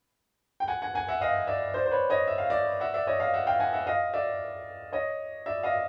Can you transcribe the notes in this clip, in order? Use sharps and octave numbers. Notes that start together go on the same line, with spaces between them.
G5
F#5 G#5
F#5 G#5
F#5 G#5
E5 F#5
D#5 F5
D5 E5
C5 D5
C5
B4 C#5
C#5 D#5
E5
F5
D5 E5
E5 F#5
D5 E5
C#5 D#5
D#5 F5
E5 F#5
F5 G5
F#5 G#5
E5 F#5
D#5 F5
D5 E5
C#5 D#5
D5 E5
D#5 F5